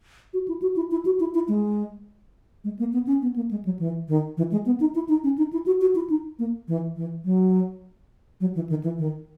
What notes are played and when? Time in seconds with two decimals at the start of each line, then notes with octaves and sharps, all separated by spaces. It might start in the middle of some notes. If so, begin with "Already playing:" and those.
0.34 F#4
0.48 E4
0.62 F#4
0.76 E4
0.91 E4
1.05 F#4
1.20 E4
1.34 E4
1.48 G#3
2.64 G#3
2.79 A#3
2.93 B3
3.07 C#4
3.22 B3
3.36 A#3
3.51 G#3
3.65 F#3
3.79 E3
4.08 D#3
4.37 E3
4.52 G#3
4.66 B3
4.80 D#4
4.95 E4
5.09 D#4
5.24 C#4
5.38 D#4
5.53 E4
5.66 F#4
5.81 F#4
5.95 E4
6.10 D#4
6.39 A#3
6.68 E3
6.96 E3
7.25 F#3
8.41 F#3
8.55 E3
8.69 D#3
8.83 E3
8.99 D#3